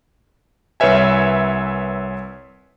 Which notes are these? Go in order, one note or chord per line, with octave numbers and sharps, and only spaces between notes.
C2 B4 C#5 E5 G#5